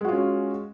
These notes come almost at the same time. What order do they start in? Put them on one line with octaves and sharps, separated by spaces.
G#3 F#4 F4 C#4